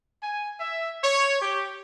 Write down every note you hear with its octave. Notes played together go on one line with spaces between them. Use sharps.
G#5
E5
C#5
G4